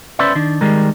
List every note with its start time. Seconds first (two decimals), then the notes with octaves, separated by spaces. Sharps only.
0.19 C#4 B4 C5 D5 E5
0.35 D#3 D4
0.61 D#3 G3 G#3 A#4